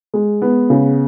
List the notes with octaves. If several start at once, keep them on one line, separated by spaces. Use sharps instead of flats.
G#3
B3
C#3